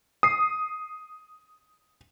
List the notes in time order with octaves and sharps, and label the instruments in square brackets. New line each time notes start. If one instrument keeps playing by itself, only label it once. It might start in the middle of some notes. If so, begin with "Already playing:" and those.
[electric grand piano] D#6 C7